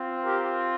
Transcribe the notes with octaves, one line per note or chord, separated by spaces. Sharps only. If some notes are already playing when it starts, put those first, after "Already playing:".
Already playing: C4 F4
G4 A#4